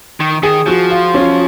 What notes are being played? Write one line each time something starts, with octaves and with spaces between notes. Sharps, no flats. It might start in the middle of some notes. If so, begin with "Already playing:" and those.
D#3
D#3 G#4
F3 F#4
F4
C#4